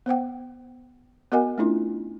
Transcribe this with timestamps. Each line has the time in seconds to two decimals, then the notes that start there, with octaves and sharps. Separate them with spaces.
0.06 B3 C5 F#5 G5
1.32 B3 F#4 A#4 D#5 F#5 G#5
1.58 A3 C#4 D4 E4 F4